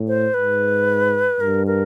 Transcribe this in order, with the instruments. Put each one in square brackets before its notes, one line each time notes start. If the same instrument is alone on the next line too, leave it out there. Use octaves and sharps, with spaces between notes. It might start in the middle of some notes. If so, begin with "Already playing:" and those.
Already playing: [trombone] A2
[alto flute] C5
[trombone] G#2 [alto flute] B4
[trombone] G2 [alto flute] A#4
[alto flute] A#4